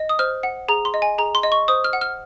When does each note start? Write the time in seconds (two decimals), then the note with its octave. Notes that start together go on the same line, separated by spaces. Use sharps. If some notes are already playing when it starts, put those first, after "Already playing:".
Already playing: D#5
0.09 D#6
0.19 C5 F6
0.43 F#5
0.68 G#4 A#5
0.85 C6
0.94 D#5
1.02 G#5
1.18 G#4 A#5
1.35 C6
1.43 D#5
1.52 C#6
1.68 C5 D#6
1.84 F6
1.93 F#5
2.01 F6